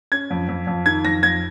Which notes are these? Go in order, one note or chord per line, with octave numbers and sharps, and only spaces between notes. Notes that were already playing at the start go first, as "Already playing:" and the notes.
C#4 G#6
F2
F2
F2
D#3 G#6
F2 A#6
F2 G#6